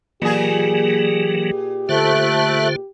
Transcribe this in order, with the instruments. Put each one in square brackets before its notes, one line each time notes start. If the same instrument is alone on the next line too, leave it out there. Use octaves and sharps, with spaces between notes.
[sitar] A#2 G#4 [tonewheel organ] E3 F#3 A#3 [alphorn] G4
[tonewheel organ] D3 F4 C5 [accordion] A3 F#6